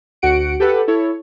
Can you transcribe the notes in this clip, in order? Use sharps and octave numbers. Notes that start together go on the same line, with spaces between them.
D2 F#4 F#5 C#7 D7
G4 A4 B4 F#5
E4 A4 C#5